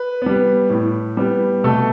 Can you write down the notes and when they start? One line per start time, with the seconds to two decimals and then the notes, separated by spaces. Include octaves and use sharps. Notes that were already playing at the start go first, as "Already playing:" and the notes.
Already playing: B4
0.22 G3 B3
0.70 A2
1.17 G3 B3
1.64 B2 A3 A4